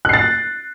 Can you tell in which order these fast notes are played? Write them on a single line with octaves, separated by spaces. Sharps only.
F#6 C7 A6